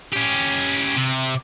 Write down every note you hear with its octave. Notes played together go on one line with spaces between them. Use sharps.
C#4 G4
C3